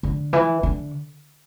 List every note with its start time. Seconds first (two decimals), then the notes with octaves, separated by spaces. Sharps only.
0.03 D3
0.33 E3
0.63 D3